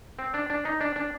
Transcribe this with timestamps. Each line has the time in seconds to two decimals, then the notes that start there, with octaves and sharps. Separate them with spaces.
0.19 C4
0.34 D4
0.50 D4
0.65 D#4
0.81 D4
0.96 D4